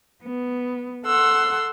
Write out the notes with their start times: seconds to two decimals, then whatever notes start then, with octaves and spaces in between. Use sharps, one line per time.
0.23 B3
1.04 A4 F#5 C6 E6